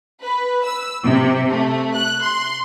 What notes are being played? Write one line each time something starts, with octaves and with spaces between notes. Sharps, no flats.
B4
E6
C3
A3
F#6
C6